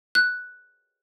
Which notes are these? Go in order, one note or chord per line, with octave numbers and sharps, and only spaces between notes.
F#6